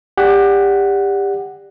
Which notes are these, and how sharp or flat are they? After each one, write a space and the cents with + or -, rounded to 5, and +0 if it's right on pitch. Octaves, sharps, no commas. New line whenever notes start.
G4 +25 D5 +0 F#5 +0